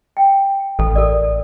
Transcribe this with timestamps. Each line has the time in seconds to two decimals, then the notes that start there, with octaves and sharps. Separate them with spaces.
0.17 G5
0.79 A1 A4
0.96 A4 A#4 D5